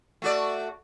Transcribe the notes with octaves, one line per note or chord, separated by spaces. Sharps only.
A3 F#4 D5